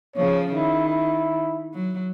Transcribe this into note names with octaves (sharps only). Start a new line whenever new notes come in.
C#3 F3 C#5
D#3 E4
E4
F#3